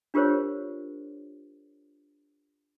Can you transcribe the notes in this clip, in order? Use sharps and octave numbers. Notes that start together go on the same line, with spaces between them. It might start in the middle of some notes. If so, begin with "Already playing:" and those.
D4 F4 G4 A#4 C5 C#5